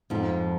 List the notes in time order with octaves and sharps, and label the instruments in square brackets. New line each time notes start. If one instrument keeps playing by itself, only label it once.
[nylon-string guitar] F2 F3 [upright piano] G#2